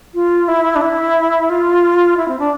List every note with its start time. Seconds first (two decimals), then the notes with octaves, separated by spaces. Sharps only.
0.14 F4
0.48 E4
0.75 D4
0.81 E4
1.50 F4
2.17 E4
2.28 C4
2.39 D4